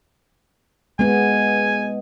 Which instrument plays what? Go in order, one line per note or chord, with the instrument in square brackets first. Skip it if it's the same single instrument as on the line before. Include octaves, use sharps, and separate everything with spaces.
[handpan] G#3 B3 [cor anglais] G#5